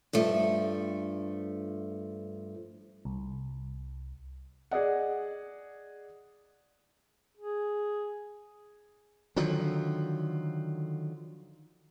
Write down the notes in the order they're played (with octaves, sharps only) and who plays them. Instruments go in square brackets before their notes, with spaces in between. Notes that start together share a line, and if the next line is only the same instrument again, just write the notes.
[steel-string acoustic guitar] G2 F3 A3
[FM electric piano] C2
[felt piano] G#4 D5 D#5 F#5
[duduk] G#4
[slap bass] D3 D#3 F3 F#3